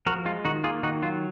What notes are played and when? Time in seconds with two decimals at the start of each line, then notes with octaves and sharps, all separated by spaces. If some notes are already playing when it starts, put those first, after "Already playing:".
0.06 F3 F#4 A#4
0.25 G#3 F4
0.45 D#3 D#4 F#4
0.64 A#3 F4 G#4
0.83 D#3 D#4 F#4
1.02 F#3 F4